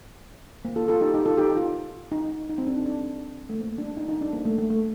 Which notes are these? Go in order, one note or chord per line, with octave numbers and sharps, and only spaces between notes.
A#3
F4 A4
F4 A4
D#4 G4
D#4 G4
F4 A4
D#4 G4
F4
D#4
D#4
C4
D4
D#4
D4
A3
A#3
D4
D#4
D#4
D4
A#3
A3
A3
A3